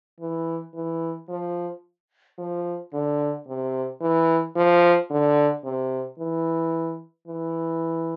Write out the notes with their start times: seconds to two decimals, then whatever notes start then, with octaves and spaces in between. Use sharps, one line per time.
0.20 E3
0.75 E3
1.29 F3
2.38 F3
2.93 D3
3.48 C3
4.01 E3
4.56 F3
5.10 D3
5.64 C3
6.18 E3
7.27 E3